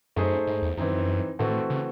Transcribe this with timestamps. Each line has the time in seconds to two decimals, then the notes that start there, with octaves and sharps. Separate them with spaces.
0.16 F#2 A3 D#4 G#4 C5 D#5
0.47 G#2
0.62 E2
0.77 F#2 E3 C4 D#4
1.39 A2 E3 A3 C4 F#4 A4
1.70 C#3